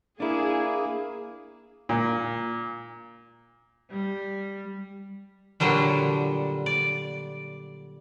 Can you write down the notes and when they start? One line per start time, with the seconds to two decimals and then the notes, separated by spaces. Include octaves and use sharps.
0.20 A#3 D4 E4 G#4
1.89 A#2
3.90 G3
5.60 A#2 D3 F#3 G3 D4
6.66 D5